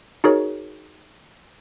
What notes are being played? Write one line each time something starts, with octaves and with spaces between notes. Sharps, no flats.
D#4 F#4 G#4 A#4 C#5